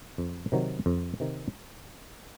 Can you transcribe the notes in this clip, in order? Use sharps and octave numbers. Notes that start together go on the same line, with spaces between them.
F2
C3 D#3 F#3
F2
C3 D#3